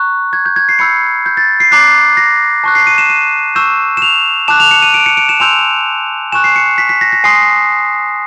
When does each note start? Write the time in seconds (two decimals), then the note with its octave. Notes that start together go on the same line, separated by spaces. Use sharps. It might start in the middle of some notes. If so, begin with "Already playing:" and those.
Already playing: A#5 C#6 F#6
0.33 G#6
0.46 G6
0.56 G#6
0.69 C7
0.79 B5 E6 G6 C#7
1.26 G6
1.37 A6
1.60 C7
1.71 A#5 D6 F#6 C7
2.17 A#6
2.64 A5 C#6 F#6
2.75 C7
2.87 D#7
2.98 E7
3.10 D#7
3.55 C#6 E6 G6 E7
3.97 E7
4.02 F7
4.48 A5 D6 F#6 E7
4.60 F7
4.71 C#7
4.82 D#7
4.94 D7
5.06 C#7
5.17 D7
5.29 E7
5.40 G#5 C6 E6 G6 F7
6.32 G#5 C#6 F#6 E7
6.44 C7
6.56 C#7
6.78 B6
6.89 B6
7.01 A#6
7.12 A#6
7.24 G#5 C6 D#6 C7